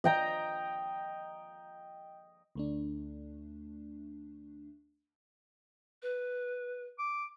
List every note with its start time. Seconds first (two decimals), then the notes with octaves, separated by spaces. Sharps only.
0.04 D#5 G5 A#5
2.55 D2 A3 D4
6.02 B4
6.99 D6